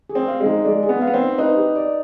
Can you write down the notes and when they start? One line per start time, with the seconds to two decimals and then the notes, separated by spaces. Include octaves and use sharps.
0.10 G#4
0.15 C4
0.28 F5
0.40 G#3
0.46 D#4
0.65 G#3 D5
0.83 G#4
0.89 B3
1.01 F5
1.07 B3
1.14 C4
1.20 D#4
1.38 D#4 B4
1.56 G4
1.76 D5